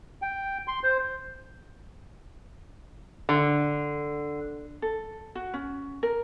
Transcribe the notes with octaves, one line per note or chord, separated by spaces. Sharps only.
G5
C6
C5
D3
A4
F#4
C#4
A#4